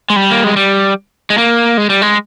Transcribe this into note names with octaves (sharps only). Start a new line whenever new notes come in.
G#3
G3
A#3
G#3
G3
G#3
A#3
G#3
G3
G#3